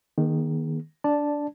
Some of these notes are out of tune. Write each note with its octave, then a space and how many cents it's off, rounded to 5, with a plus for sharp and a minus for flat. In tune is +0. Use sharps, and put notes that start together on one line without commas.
D#3 +0 A#3 +45 G#4 -5
D4 -15 D5 +0 A5 +0